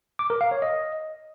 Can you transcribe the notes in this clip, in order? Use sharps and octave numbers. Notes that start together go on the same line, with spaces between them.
D6
A#4
F5
C#5
D#5